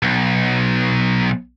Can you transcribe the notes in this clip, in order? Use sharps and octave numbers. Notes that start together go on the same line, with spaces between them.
B1